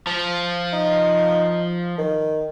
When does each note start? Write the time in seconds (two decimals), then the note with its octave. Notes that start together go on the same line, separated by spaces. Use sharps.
0.07 F3
0.73 D#4
1.98 D#3